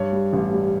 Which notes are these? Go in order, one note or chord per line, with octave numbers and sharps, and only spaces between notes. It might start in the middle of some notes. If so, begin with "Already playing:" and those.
Already playing: G2 C#5
G3
A1
G3